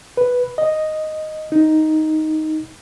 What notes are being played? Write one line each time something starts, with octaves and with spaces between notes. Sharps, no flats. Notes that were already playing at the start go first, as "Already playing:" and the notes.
B4
D#5
D#4